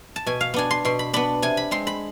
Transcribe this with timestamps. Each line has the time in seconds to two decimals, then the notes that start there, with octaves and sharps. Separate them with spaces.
0.16 A5
0.26 B2 G#5
0.41 F5
0.54 B3 D4 G#5
0.71 C6
0.85 B2 C6
0.99 B5
1.13 B3 D4 B5
1.42 C3 G#5
1.57 B5
1.71 G#3 C4 C6
1.87 B5